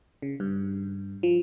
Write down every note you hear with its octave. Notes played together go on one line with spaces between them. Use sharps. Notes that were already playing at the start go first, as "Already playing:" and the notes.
C#3
G2
F3